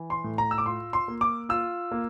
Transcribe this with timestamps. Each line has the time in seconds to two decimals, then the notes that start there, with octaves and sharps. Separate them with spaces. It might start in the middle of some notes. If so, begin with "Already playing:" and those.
Already playing: E3
0.10 C6
0.24 A2
0.38 A#5
0.51 E6
0.58 D6
0.66 F4 C6
0.93 C6
1.08 A#3
1.21 D6
1.49 F4 E6
1.91 A#3